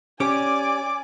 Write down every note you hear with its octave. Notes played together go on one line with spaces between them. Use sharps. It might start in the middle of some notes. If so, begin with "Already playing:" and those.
C#4 G4 C#5 D5 G#5 D6